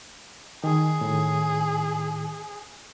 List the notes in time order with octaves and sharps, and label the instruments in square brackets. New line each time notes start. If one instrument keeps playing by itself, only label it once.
[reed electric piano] D#3 [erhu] G#4
[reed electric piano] A2 D#3